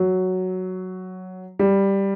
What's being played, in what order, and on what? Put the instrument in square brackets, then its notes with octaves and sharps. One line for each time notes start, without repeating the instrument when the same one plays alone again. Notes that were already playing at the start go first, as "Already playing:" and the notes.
Already playing: [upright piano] F#3
G3